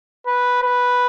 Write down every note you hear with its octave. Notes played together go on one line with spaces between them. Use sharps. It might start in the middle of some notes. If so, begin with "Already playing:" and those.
B4
B4